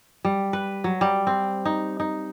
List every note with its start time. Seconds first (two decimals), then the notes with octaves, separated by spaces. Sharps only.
0.25 G3
0.53 B4
0.84 F#3
1.01 G3
1.27 C4
1.65 D#4
2.00 D#4